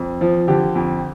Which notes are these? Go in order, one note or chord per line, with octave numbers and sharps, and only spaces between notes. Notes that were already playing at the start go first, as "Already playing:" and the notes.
Already playing: F2
F3
D3 G4
F2